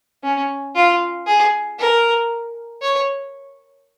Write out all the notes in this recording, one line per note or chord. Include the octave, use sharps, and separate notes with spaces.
C#4
F4
G#4
A#4
C#5